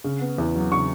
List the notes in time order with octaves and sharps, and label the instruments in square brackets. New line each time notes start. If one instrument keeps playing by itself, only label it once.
[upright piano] C#3
B3
E2
F#3
C#3 C#6